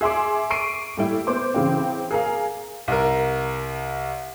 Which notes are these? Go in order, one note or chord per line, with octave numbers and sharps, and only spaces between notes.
G#4 E5 C6 D6
C#6 C7 D7 D#7
A2 G3 E4
B3 C5 D6
C#3 E3 C4
G#4 A#4 F5
C2 A#4